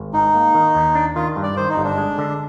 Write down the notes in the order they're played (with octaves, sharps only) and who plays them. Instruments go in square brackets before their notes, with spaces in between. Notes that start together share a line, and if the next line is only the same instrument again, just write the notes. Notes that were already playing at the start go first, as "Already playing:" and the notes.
Already playing: [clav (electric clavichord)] G#1
[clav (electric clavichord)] G#2 [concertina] D#4
[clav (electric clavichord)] A#3
D#3
D#2
D4
[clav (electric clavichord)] D#3 [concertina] F4
[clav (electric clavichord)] G2
[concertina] D5
[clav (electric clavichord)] D#3 [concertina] C5
[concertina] D#4
[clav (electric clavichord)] G1
[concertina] D4
[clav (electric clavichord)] G#3
D3